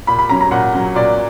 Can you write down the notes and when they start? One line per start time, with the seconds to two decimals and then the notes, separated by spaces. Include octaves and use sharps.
0.07 A#2 B5
0.18 B5
0.29 F#3 C#4 A#5
0.41 A#5
0.51 A#2 F#5
0.74 F#3 C#4
0.96 A#2 D5